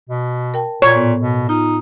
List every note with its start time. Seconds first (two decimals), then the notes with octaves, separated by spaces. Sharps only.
0.09 B2
0.54 A#4 G5 A5
0.82 A#2 C#5 A#5
0.95 A2 B3
1.20 B2
1.49 D#4 F4